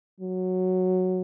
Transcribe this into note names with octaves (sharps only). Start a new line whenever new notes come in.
F#3